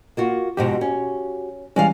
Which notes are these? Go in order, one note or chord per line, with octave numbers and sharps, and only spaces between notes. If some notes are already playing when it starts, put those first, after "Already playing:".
A#3 F4 F#4
F2 G#2 B2 F#4 G4
C#4
E3 G3 G#3 C#4 D5 F5